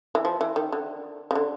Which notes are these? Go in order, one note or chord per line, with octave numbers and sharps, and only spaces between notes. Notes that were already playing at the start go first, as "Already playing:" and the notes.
E3
F3
E3
D#3
D3
C#3
D3